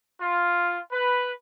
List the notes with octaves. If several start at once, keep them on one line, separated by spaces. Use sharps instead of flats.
F4
B4